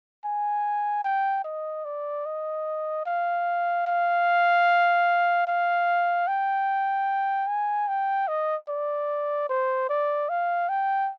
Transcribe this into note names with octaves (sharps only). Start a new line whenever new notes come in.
G#5
G5
D#5
D5
D#5
F5
F5
F5
G5
G#5
G5
D#5
D5
C5
D5
F5
G5